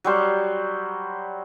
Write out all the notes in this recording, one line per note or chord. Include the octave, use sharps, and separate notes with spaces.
F#3 G3 C5